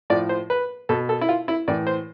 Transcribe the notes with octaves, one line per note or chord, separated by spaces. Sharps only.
A2 F3 D5
C5
B4
B2 A4
A4
E4
F4
E4
A2 E3 D5
C5